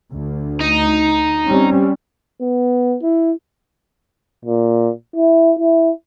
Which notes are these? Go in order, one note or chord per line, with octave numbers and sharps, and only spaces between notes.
D2
D#4
G3 C4 C#4
B3
E4
A#2
E4
E4